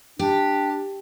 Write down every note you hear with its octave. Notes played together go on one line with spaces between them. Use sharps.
D4 G4